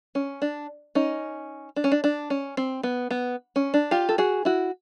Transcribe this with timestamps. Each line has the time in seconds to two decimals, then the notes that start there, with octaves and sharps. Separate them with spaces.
0.15 C#4
0.42 D4
0.95 C#4 D#4
1.76 D4
1.84 C#4
1.92 D4
2.04 D4
2.30 C#4
2.57 C4
2.83 B3
3.11 B3
3.56 C#4
3.74 D4
3.91 F4 G4
4.09 A4
4.18 F#4 G#4
4.45 E4 F#4